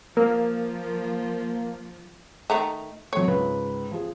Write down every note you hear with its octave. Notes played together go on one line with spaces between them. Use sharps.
F3 A#3 A#4
D#3 A3 A#5
F#3 A3 C#5
C#2 G#2 B4
F3 G#4